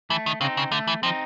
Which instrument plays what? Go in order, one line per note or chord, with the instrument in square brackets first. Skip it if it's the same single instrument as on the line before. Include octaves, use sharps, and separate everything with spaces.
[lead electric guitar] E3 [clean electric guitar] A3
[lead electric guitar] D#3
[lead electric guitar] C#3 [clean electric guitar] C4 D#4
[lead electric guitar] C#3
[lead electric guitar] D3 [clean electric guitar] A3
[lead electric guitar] E3
[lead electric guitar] F3 [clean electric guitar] C4
[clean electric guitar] D#4